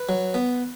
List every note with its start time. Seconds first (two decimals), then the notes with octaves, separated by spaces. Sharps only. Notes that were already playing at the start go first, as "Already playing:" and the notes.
Already playing: B4
0.09 F#3
0.34 B3